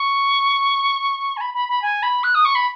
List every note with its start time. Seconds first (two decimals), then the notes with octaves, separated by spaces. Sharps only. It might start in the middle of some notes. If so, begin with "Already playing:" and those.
Already playing: C#6
1.37 G#5
1.41 B5
1.54 B5
1.69 B5
1.82 G#5
2.03 B5
2.24 F#6
2.35 D#6
2.45 C#6
2.55 B5